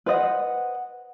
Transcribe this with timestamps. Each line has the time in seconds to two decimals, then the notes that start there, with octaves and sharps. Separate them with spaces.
0.06 B4 C5 D#5 F#5